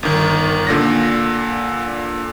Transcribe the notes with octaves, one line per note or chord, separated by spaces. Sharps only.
G1 D#3
A#2 D3 A#6